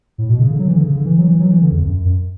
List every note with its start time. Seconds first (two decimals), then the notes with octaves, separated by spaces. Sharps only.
0.18 A2
0.29 B2
0.39 C#3
0.51 D3
0.59 F#3
0.68 E3
0.75 D3
0.84 C#3
0.96 D3
1.06 E3
1.18 F#3
1.28 E3
1.40 F#3
1.51 E3
1.62 D3
1.72 E2
1.83 F#2
2.05 F#2